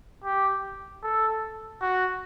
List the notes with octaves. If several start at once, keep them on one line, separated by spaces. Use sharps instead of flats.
G4
A4
F#4